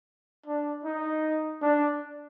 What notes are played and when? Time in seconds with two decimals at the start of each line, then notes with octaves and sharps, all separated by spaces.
0.46 D4
0.85 D#4
1.62 D4